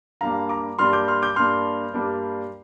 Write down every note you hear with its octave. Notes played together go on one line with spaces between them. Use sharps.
G2 G3 A#3 D4 F5 A#5
A#5 D6
G2 G3 A#3 D4 C6 F6
D6 G6
C6 F6
D6 G6
G2 G3 A#3 D4 C6 F6
G2 G3 A#3 D4